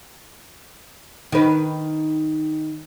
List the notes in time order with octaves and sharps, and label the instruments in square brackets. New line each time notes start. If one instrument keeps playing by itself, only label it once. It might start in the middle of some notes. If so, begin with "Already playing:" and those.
[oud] D#3 B4